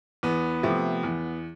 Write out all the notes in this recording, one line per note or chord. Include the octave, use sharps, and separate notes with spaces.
E2 B3
C3 F3 A3
E2